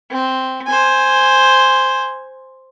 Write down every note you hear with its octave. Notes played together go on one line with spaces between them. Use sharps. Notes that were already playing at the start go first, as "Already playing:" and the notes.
C4
C5 G#5